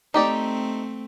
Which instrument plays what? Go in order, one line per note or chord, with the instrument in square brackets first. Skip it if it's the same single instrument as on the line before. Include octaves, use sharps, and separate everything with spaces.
[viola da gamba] A3 C4 [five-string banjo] D#4 G4 D5